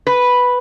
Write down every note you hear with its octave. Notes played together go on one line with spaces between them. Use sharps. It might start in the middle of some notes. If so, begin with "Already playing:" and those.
B4